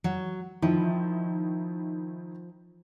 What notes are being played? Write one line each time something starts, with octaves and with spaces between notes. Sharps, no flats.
F#3
D#3 F3 E4